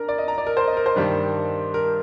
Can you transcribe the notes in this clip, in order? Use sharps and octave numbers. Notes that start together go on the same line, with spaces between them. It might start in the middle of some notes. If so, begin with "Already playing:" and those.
Already playing: D4 A#4 A#5
D5
D#5
A#5
D5
A#4
C5
D#5
A#4
C5
G2 D#3 G3 D4
A#4